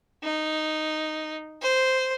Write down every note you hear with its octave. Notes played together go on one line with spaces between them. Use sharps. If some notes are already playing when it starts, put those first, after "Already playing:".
D#4
C5